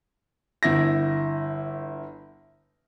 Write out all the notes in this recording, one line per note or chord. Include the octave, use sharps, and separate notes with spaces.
G1 E4 A#6